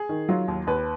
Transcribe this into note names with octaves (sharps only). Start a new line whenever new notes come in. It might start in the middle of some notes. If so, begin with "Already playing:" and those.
Already playing: G#4
D#3
F#3 F4
D#2
D#2 B4